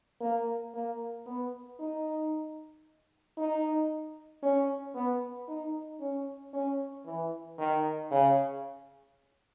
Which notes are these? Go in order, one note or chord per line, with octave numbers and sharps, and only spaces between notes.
A#3
A#3
B3
D#4
D#4
C#4
B3
D#4
C#4
C#4
E3
D#3
C#3